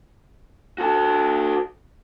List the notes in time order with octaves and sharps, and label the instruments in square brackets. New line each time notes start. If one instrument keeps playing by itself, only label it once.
[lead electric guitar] F#4 A4